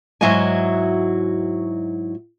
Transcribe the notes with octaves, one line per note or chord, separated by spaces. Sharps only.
G#2 F#3 E4 F#4 D#5 G#5